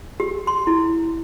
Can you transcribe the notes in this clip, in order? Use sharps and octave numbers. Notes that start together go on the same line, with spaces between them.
G4
C6
E4